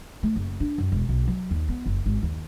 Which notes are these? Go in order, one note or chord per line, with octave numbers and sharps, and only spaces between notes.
A3
F#1
D4
F#2
E1
B1
F#3
D#2
B3
F#1
G#1
D#2